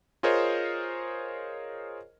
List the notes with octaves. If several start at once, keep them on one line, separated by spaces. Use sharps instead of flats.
F4 G#4 A#4 C5 C#5 D#5